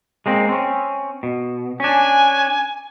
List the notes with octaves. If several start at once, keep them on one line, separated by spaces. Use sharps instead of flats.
G#3 A#3 C4
C4 C#4
B2
C#4 D4 G#5